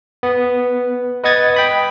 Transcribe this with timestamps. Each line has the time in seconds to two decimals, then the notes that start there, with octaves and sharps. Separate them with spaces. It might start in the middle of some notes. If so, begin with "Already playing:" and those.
0.23 B3
1.24 B4 D#5 F#5 D#6 G#6 A6
1.54 G5 B5 D#6